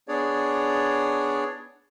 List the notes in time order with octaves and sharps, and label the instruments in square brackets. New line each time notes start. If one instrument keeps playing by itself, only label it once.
[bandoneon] B3 D4 G#4 C#5 D5